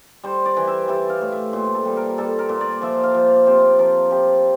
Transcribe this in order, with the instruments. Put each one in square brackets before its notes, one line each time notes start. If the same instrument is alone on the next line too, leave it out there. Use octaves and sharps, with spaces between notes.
[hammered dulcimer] G3 C5
D5
E3
E5
G3 E5
F5
A2
E5
A#2 C5
A4
G3
A#4
G3 A4
A#4
A#2
D5
F3 E5
F5
F3
D5
C3 C5
F3 A#4
F3 G4